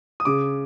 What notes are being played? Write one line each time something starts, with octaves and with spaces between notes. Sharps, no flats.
D#6
C#3 D6